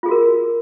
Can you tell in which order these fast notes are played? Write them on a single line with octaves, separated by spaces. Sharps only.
F4 G#4 F#4 A#4